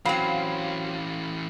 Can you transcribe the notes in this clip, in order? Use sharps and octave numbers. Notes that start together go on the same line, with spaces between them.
E3 F#3 C4 C#4 F5 B5 C7